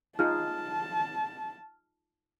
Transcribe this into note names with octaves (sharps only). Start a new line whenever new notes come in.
D#4 F4 G#4 A5 F6